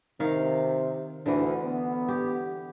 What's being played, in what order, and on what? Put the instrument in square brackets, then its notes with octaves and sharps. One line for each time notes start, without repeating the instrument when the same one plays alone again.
[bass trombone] C3 [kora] D#3 F5
[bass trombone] D2 [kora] D3 E3
[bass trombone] B3
[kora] G4